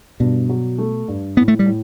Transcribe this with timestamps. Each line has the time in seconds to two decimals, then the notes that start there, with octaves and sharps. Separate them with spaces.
0.20 G2 B2
0.49 F#3
0.78 A3
1.08 G2
1.37 A2 B3
1.48 A3
1.59 G3
1.66 A2